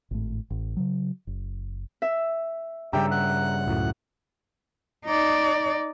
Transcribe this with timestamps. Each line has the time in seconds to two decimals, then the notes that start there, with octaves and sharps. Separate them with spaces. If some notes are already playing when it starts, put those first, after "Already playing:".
0.11 G#1 A2
0.50 A1
0.77 C#3 F#3
1.27 F#1
2.02 E5
2.93 G2 C#3 G3 G4 E5 G5 A#5
3.11 F#5 F#6
3.67 C#2 F#2 A2
5.05 D#4 D5